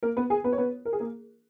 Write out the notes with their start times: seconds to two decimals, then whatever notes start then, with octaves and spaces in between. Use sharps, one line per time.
0.03 A#3 A#4
0.17 B3 B4
0.30 G#4 G#5
0.44 B3 B4
0.52 C#5
0.58 B3 B4
0.85 A#4
0.93 G#4
1.00 A#3 A#4